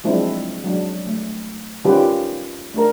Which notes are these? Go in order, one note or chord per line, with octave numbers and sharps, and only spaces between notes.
F3 F#3 G#3 C4 D4 E4
F#3 G#3 D4
A3
D#3 G3 C#4 F4 G4 B4
A3 D4 A4 A#4